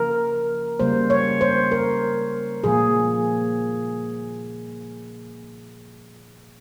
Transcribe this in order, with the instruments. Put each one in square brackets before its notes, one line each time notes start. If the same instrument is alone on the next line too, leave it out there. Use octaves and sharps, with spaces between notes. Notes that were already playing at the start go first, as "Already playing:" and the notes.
Already playing: [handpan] C#3 F3 A#3 A#4
C#3 G3 A#3 C5
C#5
C5
A#4
A#2 F3 A#3 G#4